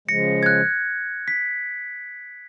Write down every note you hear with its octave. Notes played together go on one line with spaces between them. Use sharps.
C#3 F3 G#3 A#6 C#7
G#6
F#6
B6